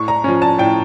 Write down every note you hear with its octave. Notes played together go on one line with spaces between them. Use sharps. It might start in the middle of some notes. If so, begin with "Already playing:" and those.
Already playing: A2 C#6
A#5
F3 C#4
A5
A2 G5